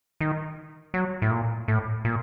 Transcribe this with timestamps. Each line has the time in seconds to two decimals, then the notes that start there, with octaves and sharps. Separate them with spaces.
0.21 D#3
0.94 F#3
1.22 A2
1.31 A#2
1.68 A2
2.05 A#2